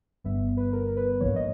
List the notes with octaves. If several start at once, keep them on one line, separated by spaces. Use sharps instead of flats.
G1 G2 G3 B3 E5
B4
A#4
B4
A#1 G#2 E3 A#3 C#5
D#5